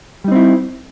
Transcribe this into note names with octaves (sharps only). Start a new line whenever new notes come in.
G3 C4 D#4 E4